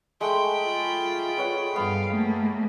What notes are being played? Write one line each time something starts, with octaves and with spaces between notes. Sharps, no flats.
G#3 A3 G5 B5
F4
B4 C#5 F#5
G2 B3 F5
A3 A#3